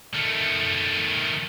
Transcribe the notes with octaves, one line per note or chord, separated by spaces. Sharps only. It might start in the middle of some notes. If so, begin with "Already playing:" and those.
D#3 A3